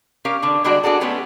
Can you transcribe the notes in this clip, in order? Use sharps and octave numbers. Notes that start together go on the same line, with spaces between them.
C#4 G4 A#4 F5
D3 D4
D3 G3 G#3 D4 F#4 D5
D4 F#4 G#4 A4
G#3 A3 B3 C#4 G4 A4